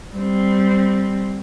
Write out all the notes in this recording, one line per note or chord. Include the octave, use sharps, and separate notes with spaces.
G3 C4